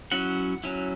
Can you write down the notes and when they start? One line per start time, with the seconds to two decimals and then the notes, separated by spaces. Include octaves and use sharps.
0.11 F#3 C#4 E4 F#5
0.64 F#3 C#4 E4